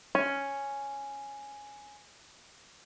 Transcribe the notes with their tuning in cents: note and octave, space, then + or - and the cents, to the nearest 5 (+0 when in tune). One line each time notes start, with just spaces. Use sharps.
C#4 +0